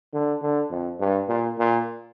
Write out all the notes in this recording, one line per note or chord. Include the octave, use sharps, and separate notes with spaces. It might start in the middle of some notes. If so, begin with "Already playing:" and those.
D3
D3
F2
G2
A#2
A#2